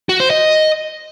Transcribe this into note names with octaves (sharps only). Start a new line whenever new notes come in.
F#4
C5
D#5